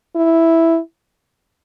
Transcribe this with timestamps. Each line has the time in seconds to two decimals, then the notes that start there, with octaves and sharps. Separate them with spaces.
0.16 E4